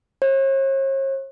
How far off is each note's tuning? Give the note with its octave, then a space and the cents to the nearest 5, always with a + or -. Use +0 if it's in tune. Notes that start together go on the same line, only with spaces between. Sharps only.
C#5 -45